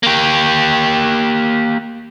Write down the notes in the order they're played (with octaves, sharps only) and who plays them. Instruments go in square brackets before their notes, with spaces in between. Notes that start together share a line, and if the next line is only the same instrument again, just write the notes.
[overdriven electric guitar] A#3 G4